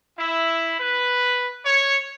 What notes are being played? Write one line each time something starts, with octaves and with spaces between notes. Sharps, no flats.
E4
B4
C#5